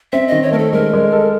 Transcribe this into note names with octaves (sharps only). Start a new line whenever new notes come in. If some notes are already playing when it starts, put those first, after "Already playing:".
C4 E5
D#3 D#5
C#5
A3 A#4
A4
G#3 A#4
G#3
A4